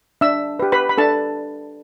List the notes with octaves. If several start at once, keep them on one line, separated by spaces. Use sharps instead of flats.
D4 E5 E6
G4 B4
B4 B5
B5
D4 A4 A5